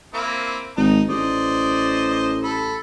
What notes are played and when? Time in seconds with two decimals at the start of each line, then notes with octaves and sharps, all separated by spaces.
0.14 A#3 C4 E4
0.77 G#1 D#4
1.09 A1 C5 D5 D#5
2.43 A4 B5